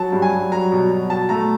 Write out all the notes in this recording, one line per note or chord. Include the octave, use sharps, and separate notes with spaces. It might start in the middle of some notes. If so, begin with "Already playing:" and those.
Already playing: F#3 A5
G2
G#5
G2
F#3 A#5
B2
B2
B2 A5
A3 A#5